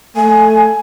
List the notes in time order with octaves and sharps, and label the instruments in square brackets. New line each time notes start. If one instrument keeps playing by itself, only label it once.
[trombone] A3 [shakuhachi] G#5